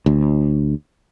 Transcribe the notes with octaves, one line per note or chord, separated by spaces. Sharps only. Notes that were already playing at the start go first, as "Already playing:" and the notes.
D2